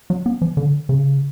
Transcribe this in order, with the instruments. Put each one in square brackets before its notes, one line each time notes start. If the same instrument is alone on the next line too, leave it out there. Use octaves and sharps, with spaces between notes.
[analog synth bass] F#3
B3
F3
D3
C#3